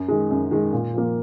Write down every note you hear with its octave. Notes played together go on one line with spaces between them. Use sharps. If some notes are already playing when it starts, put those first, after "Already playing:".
Already playing: F#2
D#3 G#3
F#2
D#3 G#3
A#2
F3 A#3